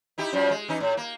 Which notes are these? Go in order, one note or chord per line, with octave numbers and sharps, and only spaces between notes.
D#4 E4 G4
F#2 F3 G3
G#3
E3 C#4 D#4
A2
A#3